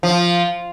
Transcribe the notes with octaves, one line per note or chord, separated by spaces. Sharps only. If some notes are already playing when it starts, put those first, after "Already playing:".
F3